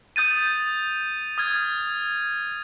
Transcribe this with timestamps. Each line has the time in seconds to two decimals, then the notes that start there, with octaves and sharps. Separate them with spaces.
0.16 D#6 G6 A6 D#7
1.38 D#6 F6 G#6